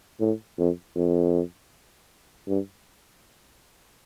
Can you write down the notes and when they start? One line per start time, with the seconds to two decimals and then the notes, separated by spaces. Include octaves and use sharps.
0.20 A2
0.58 F2
0.95 F2
2.47 G2